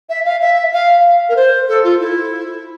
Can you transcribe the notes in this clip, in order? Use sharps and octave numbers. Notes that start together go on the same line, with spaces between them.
E5
F5
E5
F5
A#4
C5
A4
F4
E4